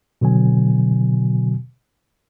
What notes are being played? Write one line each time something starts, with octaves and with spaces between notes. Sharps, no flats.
B2 D3 F#3 G#5